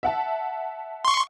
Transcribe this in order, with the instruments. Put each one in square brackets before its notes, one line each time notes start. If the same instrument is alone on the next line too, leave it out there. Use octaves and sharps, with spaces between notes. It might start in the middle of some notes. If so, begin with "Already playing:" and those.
[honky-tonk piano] E5 F#5 A5
[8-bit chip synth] C6 C#6